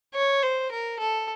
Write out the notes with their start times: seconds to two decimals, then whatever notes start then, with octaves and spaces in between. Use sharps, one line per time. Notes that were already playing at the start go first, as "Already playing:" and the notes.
0.14 C#5
0.43 C5
0.71 A#4
0.99 A4